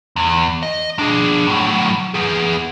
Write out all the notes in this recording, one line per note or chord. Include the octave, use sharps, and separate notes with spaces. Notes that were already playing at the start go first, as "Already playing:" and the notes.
E2
D#5
D4 G#4
A2 F#3
B3 G#4